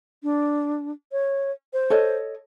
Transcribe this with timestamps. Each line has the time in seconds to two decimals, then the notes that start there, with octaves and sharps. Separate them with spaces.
0.23 D4
1.12 C#5
1.73 C5
1.90 A4 C#5 D#5